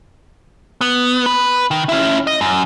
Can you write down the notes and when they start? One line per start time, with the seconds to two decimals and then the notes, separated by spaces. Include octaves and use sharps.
0.81 B3
1.26 B4
1.71 D#3
1.89 C#4 E4
2.27 D#5
2.41 F#2